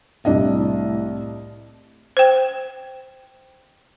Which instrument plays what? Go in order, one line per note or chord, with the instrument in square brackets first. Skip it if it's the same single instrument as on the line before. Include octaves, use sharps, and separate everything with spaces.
[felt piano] C2 D4 D#5 [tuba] A2
[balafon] C5 G5